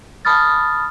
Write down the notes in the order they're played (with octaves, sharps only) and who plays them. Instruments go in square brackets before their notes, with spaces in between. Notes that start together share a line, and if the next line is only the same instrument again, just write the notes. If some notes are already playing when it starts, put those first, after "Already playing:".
[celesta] A5 B5 D#6 F6 A6